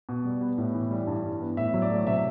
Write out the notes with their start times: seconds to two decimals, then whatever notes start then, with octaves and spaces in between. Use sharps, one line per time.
0.09 B2
0.25 G3
0.41 B3
0.58 A2
0.74 E3
0.91 G3
1.07 G2
1.24 E3
1.41 B3
1.57 A2 E5
1.74 F#3
1.82 D5
1.90 A3
2.07 C3 E5